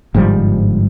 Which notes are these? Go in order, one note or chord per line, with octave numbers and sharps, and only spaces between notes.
G1 G#2 F3 G3